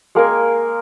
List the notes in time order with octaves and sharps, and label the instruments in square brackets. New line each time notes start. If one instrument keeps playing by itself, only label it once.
[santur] G#3 A#3 A#4 G#5